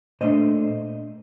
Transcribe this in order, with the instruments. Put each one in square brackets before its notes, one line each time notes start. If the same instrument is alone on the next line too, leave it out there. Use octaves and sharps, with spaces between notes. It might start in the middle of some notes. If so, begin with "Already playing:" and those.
[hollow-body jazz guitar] A#2 A3 D4 C5 D#5